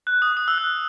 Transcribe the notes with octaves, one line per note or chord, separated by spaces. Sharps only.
F#6
D#6
D#6
E6
F#6